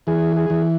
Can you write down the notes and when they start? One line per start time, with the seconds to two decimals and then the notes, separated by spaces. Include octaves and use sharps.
0.07 E3 G#4
0.36 G#4
0.50 E3